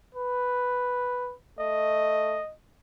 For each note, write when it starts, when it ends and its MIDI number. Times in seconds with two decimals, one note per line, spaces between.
0.15 1.33 71
1.59 2.39 57
1.59 2.53 75